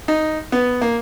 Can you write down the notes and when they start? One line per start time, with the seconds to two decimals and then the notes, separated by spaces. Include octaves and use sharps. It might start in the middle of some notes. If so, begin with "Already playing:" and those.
0.08 D#4
0.52 B3
0.81 A#3